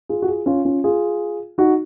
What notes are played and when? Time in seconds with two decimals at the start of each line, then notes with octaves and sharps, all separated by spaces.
0.09 F4 G#4
0.22 F#4
0.27 F4 G#4
0.46 C#4 F4
0.65 C#4 F4
0.84 F4 G#4
1.58 D#4 F#4